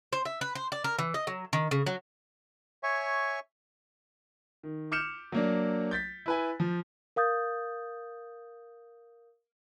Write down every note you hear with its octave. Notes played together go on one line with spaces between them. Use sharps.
C5
E5
B4
C5
D5
A#4
E3
D#5
F#3
D#3
C#3
F#3
C#5 E5 G#5 C#6
D#3
D6 F6 G6 C#7 E7
F#3 A#3 D4
G6 A6 B6
E4 B4 G#5
F3
A#4 F5 D#6 G6 A6